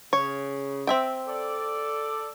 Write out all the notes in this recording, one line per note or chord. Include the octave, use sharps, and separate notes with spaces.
C#3 C#5
C4 E5 G5
A4 D5